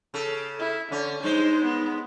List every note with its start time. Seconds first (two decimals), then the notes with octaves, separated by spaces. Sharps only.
0.14 C#3 A4
0.59 E4
0.92 D3 C#4
1.23 G2 G#3 D#4 C5
1.65 B3